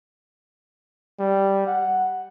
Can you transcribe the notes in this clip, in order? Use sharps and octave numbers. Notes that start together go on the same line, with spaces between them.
G3
F#5